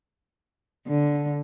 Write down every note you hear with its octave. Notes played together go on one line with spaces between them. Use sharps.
D3